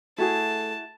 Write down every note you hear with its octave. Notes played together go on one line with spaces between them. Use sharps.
A3 E4 F#4 G#4 A5